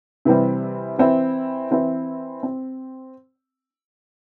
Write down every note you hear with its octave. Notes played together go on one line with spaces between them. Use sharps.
C3 E3 G3 C4
E3 C4 E4
E3 C4 E4
C4